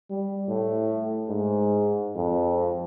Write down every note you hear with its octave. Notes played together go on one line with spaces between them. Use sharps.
G3
A2
G#2
F2